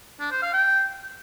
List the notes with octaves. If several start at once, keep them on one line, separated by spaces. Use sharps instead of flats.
D4
C5
F5
G5